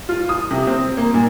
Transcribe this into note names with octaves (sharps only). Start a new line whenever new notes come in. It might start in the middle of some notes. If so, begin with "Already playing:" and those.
F4
D#6
C3
C4
A#3
A#2